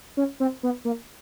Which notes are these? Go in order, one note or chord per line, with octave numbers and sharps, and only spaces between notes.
C#4
C4
B3
A#3